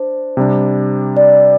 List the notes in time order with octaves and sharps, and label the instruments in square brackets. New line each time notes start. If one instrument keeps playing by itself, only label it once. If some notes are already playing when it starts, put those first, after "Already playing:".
Already playing: [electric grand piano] D4 [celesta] C5
[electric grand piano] C3 G3 D4
[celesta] D5